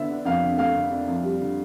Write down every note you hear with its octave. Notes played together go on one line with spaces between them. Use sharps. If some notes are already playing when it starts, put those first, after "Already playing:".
Already playing: D3 B3 E5
D4
F2 F5
D3
A3 F5
D3
D4
F2
G3
D3